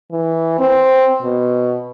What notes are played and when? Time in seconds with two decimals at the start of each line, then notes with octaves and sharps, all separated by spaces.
0.11 E3
0.59 C4
1.22 B2